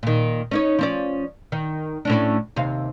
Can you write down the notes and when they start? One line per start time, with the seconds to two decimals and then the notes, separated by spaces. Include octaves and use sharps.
0.03 A#2 D#3
0.51 C#4 D#4 C#5
0.79 F3 C#4 D5
1.52 D#3
2.05 A2 C#4 D4
2.56 D#2 C3 F5